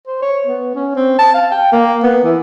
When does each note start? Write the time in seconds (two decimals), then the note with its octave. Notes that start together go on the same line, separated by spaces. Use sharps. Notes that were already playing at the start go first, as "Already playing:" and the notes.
0.07 C5
0.22 C#5
0.46 B3
0.75 C#4
0.96 C4
1.19 A5
1.34 F5
1.51 G5
1.72 A#3
2.03 B3
2.24 E3